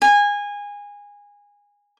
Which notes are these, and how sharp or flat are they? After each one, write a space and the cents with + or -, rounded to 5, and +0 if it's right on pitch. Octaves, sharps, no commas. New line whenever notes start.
G#5 -20